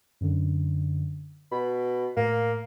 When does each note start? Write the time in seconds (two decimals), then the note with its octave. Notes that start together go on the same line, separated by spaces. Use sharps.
0.21 F#2 D3
1.52 B2 B5
2.17 A2 A#3